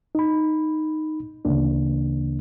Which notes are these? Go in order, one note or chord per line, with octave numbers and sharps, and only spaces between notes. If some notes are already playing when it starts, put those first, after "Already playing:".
D#4 B5
D2 C#3 E3 A#3 D4